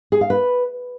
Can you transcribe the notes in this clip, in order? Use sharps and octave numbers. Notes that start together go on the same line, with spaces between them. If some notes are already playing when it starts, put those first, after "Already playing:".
G#4
F5
B4